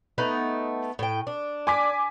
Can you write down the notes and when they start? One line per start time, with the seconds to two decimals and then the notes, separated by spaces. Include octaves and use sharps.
0.18 A3 B3 D#4
0.99 A2 G5
1.27 D4
1.67 G#5 D6 B6